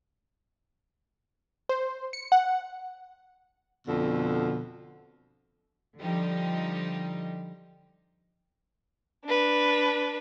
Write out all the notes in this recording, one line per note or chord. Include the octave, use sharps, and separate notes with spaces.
C5
C#7
F#5
F2 B2 D3
D3 F3 G3 D#4 G4
D4 B4